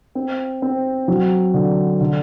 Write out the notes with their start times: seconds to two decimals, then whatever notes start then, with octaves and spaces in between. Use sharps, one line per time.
0.15 C4
0.62 C4
1.08 F#3
1.54 D3
2.01 D3